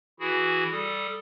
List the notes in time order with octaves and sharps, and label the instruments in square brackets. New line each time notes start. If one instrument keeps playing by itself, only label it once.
[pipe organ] E3 E4 F#4 G#4
G3 A4 D#6